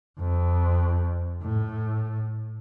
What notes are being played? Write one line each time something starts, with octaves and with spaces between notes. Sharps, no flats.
F2
A2